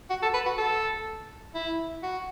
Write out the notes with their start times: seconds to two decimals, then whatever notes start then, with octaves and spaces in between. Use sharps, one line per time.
0.10 F#4
0.22 A4
0.34 B4
0.46 F#4
0.58 A4
1.55 E4
2.03 F#4